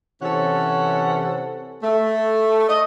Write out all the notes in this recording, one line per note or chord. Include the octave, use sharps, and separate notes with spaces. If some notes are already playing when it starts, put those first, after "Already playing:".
C3 E3 C#4 A4 C#5 F#5
A3
D#5